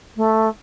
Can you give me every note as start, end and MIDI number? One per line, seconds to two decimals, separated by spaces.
0.17 0.48 57